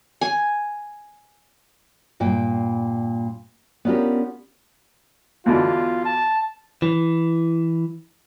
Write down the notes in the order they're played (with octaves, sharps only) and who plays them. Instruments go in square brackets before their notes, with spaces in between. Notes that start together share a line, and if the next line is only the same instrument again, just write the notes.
[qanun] G#5
[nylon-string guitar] G2 A#2 G5
B3 C#4 D4 F4 G4 A#4
[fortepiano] E2 B2 D3 [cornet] F4
[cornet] A5
[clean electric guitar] E3